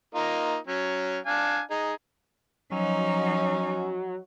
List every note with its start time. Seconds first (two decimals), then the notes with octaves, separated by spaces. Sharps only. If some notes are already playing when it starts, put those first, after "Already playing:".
0.15 A#3 D#4 F4
0.67 F#3 C#4
1.26 D4 F5 G#5
1.71 D#4 G#4
2.71 F3 F#3 C#4 D#4